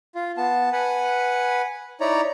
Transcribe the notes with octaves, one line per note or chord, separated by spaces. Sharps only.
F4
B3 A5
B4 F#5 G#5
D#4 E4 C#5 D5 A#5